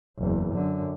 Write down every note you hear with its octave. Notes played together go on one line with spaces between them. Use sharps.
F#1 E2
F#2 D3